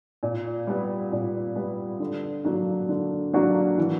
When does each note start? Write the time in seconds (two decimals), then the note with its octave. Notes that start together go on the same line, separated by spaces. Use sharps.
0.23 A#2
0.67 G3 B3
1.12 A#2
1.56 G3 B3
2.00 D3
2.45 F#3 A#3 D4 F#4
2.89 D3
3.33 F#3 A#3 D4 F#4
3.78 E3